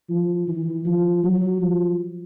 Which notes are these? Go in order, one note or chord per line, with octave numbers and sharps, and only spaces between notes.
F3
E3
F3
F#3
F3